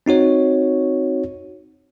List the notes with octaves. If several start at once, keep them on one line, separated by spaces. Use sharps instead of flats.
C4 D#4 F#4 C#5